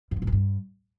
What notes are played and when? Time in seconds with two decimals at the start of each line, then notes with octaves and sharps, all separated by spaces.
0.11 G2
0.17 F3
0.22 A2
0.27 F3
0.32 G2